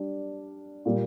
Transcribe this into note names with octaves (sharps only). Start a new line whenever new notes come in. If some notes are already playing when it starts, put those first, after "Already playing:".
Already playing: G3 D4
A#2 G3 A#3